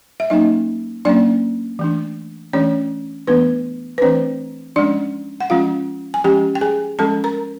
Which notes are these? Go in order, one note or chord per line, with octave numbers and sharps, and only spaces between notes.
E5
F#3 A#3 C#4 D#4 D#5
F#3 A#3 C#4 D4 D5
E3 A3 D4
E3 A3 C#4 D4 C#5
E3 A3 B3 D4 B4
B4
E3 A3 C4 D4 C5
F3 G#3 C#4 D4 D5
F#5
F3 G#3 C#4 F4 F5
G#5
F3 G#3 C#4 G4 G5
G5
G#4 G#5
F3 G#3 C#4 A4 A5
A#4 A#5